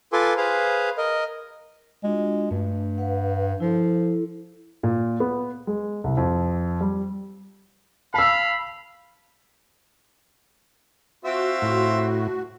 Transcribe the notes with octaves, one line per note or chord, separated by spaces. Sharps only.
F4 A4 B4 G#5 C6 D6
G#4 B4 C5 F5
A#4 D#5
G#3 D4 F4 F#4
G2 A3
B4 F5 F#5
F3 E4 A4
A#2
B3
G#3
C2
F2
G3
F5 A5 B5 E6
C4 F4 F#4 E5
A2